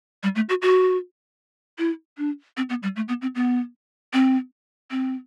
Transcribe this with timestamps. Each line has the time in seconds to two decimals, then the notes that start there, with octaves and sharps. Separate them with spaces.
0.23 G3
0.36 A3
0.49 F#4
0.62 F#4
1.78 E4
2.18 D4
2.57 C4
2.70 B3
2.83 G3
2.96 A3
3.08 B3
3.22 C4
3.35 B3
4.13 C4
4.91 C4